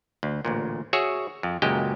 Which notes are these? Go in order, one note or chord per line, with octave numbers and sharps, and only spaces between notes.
D2
A1 D2 A#2
F#4 G#4 C#5 E5
F2
C#2 F#2 A#2 G#3 G4 G5